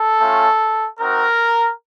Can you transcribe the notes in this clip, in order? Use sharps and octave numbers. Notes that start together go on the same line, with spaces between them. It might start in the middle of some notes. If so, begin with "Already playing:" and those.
Already playing: A4
A3 C#4 F4
C4 D#4 F#4 A#4